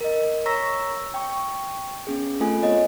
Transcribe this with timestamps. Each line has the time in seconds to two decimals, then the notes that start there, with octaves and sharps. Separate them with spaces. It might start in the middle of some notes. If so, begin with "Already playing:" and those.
0.01 A#4 D#5
0.46 C#5 A#5 C#6 E6 A#6 B6
1.14 G5 C#6
2.07 B3 C#4 G#4
2.40 A3 C4 F4 A4 G#5
2.62 B3 C#5 D#5 F#5